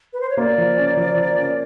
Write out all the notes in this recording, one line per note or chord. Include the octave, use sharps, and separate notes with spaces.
B4
C5
C#5
A#3 D5
F3
C#4
F3
F3
C#4